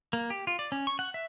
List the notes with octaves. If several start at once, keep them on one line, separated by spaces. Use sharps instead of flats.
A#3
G4
F4
D5
C#4
C#6
F#5
E5